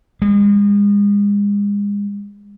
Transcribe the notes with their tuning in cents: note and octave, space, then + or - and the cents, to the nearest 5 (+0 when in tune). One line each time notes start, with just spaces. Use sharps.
G#3 -35